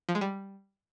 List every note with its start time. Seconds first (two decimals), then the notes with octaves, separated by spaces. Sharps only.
0.09 F3
0.15 G#3
0.21 G3